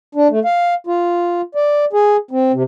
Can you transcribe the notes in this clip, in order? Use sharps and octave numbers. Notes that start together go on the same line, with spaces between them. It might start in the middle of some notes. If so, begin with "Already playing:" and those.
D4
A3
F5
F4
D5
G#4
C4
C3